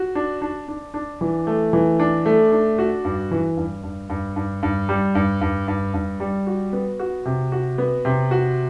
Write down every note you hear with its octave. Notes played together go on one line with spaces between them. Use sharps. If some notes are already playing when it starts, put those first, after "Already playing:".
Already playing: F#4
D4
D4
D4
D4
E3
A3
E3
D4
A3
D4
F#4
G2
E3
G2
G2
G2
G2
G2
G3
G2
G2
G2
G2
G3
F#4
B3
F#4
C3
F#4
B3
C3
F#4